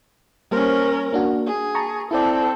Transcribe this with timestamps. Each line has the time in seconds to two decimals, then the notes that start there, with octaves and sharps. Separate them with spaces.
0.51 G3 A#3 C#4 A#4 C5
1.13 A#3 D4 F#4
1.46 G#4
1.75 A5 A#5 C#6
2.11 C4 E4 A4 D5